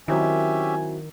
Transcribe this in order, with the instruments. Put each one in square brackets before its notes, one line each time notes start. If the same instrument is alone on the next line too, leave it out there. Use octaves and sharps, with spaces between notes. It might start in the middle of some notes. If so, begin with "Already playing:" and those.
[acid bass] D#3 [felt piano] F#3 C4 E4 [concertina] C#4 G4 E5 [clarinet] G#5